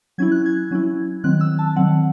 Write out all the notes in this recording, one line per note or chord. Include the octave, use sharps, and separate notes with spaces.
F#3 C#4 E4 G#6
F#6
G#6
F#3 C#4 E4
D#3 F#3 C4 F#6
E6
A5
D#3 F#3 C4 F#5